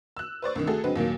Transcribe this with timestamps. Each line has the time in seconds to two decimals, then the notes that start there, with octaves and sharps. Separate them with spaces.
0.17 E6 F#6
0.42 B4 C5 D5 C#6
0.56 C2 D3 D#3
0.67 A3 F#4 G#4 A4
0.84 D3 F#3 G#3 C4 F#4 B4
0.96 D#2 A#2 F#3 A#3